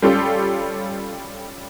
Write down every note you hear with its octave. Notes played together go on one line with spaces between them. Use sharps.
G3 C#4 F4 G4 A4